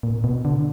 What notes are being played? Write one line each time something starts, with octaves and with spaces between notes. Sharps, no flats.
A#2
B2
D3